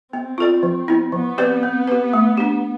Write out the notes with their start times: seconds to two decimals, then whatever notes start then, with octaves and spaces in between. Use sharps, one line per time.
0.13 B3 C4
0.38 F4 A4 D5
0.63 F3
0.88 B3 E4
1.12 F3 B3
1.38 C4 G4 B4 D5
1.63 C4
1.88 G4 B4
2.13 A3
2.37 D4 G4